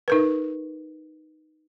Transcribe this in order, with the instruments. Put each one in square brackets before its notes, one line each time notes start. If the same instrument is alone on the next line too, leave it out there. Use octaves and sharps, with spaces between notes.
[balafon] D#4 A#4 B4